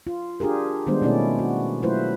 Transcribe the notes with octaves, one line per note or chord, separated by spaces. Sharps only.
F4
D4 F4 G4 G#4 A#4
D#3 G3 G#3 B3 D4 C5
B2 A3 A#3 C#4 E4 D5
F#4
F#3 A3 E4 F4 B4 C5